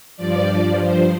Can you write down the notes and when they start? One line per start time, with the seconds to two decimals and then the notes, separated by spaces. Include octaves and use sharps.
0.17 G2 F3 D5
0.80 C5